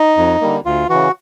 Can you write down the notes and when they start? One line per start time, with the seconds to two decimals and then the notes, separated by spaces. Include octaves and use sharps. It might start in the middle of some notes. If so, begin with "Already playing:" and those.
Already playing: D#4
0.17 F2
0.41 D3 G3 A#3
0.65 D2 F4
0.89 C#3 E3 F#4